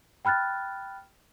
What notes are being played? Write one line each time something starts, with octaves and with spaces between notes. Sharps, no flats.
G5 B5 F6 F#6 A6